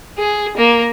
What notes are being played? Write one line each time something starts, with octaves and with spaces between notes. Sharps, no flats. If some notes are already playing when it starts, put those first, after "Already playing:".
G#4
A#3